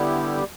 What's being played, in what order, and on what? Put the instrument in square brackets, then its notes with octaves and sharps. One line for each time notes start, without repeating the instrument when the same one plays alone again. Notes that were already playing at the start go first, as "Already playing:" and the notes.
Already playing: [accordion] D3 G3 B3 E4 G4